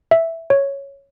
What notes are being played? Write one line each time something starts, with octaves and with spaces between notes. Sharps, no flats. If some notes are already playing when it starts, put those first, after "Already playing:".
E5
C#5